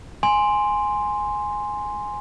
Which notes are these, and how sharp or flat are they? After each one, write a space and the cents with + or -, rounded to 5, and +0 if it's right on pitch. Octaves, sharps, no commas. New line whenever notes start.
G#5 +0 C6 +0